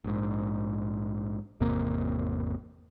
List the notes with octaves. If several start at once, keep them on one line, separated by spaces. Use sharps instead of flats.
A#1 G#2
G#1 E2 C3 A#3